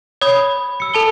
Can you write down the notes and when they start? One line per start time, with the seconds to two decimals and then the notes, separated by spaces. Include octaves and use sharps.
0.21 C#5 B5 D#6 G#6
0.80 E6 C#7
0.94 A4 A5 G7